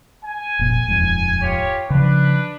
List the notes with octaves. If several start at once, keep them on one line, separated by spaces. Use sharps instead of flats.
G#5
F1 A#2
D#1 F2 G#2
F4 G4 C#5
C#3 F3 D4 B4